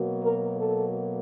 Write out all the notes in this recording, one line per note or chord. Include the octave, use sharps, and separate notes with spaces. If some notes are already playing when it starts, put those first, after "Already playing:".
Already playing: B2 F#3 A#3
A#4
A4